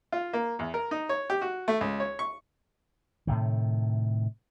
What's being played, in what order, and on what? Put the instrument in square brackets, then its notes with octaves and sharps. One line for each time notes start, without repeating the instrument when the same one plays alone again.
[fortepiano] F4
A#3
E2
A#4
D#4
C#5
G4
F#4
A3
C#2
C#5
C#6
[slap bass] A2 C3 D#3